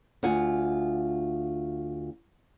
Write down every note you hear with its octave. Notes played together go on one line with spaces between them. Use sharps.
D2 F4 F#5 G#5